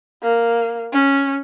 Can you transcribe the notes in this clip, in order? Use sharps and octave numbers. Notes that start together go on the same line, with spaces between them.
A#3
C#4